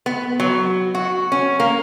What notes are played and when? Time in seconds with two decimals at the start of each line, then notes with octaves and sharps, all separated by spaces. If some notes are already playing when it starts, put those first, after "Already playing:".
0.06 B3
0.40 F#3
0.95 F#4
1.32 C#4
1.60 A#3